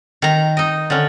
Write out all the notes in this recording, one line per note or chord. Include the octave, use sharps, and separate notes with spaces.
D#3 A#5
D#4 D#5
D3 C#4